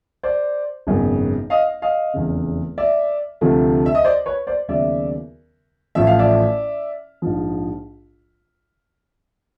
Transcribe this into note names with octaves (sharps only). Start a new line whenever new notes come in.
C5 D5
G#1 F#2 C#3 F#3 B3
D#5 F5
D#5 F5
F1 E2 C#3
D5 E5
D2 C3 F3 A3
E5
D#5
C5 D5
B4 C#5
C5 D5
D#2 C#3 F#3 B3 D5 E5
A1 A2 F3 E5
F5
D5 E5
A#1 G#2 F3